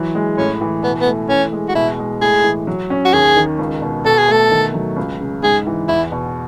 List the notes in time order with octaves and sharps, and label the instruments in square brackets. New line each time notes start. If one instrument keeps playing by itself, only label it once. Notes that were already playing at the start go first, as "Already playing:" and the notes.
Already playing: [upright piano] E3 F#3
G#3
[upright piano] A2 [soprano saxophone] C#4
[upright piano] E3
[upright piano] B2 [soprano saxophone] B3
[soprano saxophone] B3
[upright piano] A3
[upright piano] E3 [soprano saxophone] C#4
[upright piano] G#3
[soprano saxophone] F#4
[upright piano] B2 [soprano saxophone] E4
[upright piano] G#3
[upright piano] A2 [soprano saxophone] G#4
[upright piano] E3
F#3
C#4
[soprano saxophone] F#4
[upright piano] D#2 [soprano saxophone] G#4
[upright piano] D#3
C#2
B2
[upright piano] B2 [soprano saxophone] A4
[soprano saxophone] G#4
[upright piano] A3 [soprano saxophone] A4
[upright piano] D#3
F#3
C#2
C#3
[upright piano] G#2 [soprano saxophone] G#4
[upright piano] E3
[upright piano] E2 [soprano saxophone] E4
[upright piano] B2